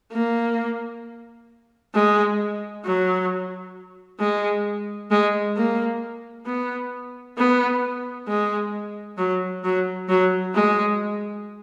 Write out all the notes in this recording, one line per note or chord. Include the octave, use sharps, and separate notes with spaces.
A#3
G#3
F#3
G#3
G#3
A#3
B3
B3
G#3
F#3
F#3
F#3
G#3